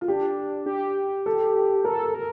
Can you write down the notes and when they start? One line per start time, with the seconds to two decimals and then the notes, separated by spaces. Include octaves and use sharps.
0.01 F4
0.08 D4 G4
0.66 G4
1.26 A4
1.84 A4 A#4
2.15 A#4